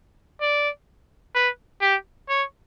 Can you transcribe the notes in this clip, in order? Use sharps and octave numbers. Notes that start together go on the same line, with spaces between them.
D5
B4
G4
C#5